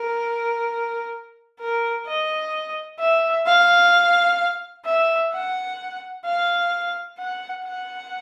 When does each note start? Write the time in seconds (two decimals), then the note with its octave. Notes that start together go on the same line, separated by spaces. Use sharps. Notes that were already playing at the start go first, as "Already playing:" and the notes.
Already playing: A#4
1.60 A#4
2.06 D#5
3.00 E5
3.46 F5
4.85 E5
5.33 F#5
6.25 F5
7.19 F#5
7.65 F#5